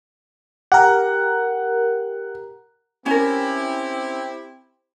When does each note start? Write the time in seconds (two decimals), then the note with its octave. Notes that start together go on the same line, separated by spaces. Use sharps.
0.72 G4 A#4 F#5
3.06 C4 C#4 E4 G4 A#4